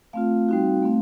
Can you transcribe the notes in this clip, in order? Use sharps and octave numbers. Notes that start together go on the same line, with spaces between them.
A3 C4 F4 F5
G3 C4 D#4 F#4
A3 C4